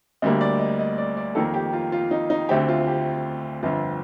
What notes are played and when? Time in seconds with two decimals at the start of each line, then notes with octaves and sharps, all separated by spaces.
0.22 D2 D3 G3 A#3 D#5
0.41 D5
0.59 D#5
0.79 D#5
0.98 D5
1.17 D5
1.35 F2 D#3 A#3 A4
1.54 G4
1.73 F4
1.92 F4
2.11 D#4
2.30 D#4
2.49 D2 D3 A3 C4 G4
2.69 F4
2.87 G4
3.63 G1 F2 D3 F4